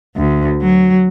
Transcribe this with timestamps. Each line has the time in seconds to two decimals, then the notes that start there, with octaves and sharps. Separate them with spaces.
0.16 D2
0.62 F#3